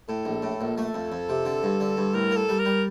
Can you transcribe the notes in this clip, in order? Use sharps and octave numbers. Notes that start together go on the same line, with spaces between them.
A2 A4
A#1
A2
A#1
A3 A4
F2
F2
C3
D3
G2
D3
G2
A2 A#4
A#3
A4
G3
A#4
G3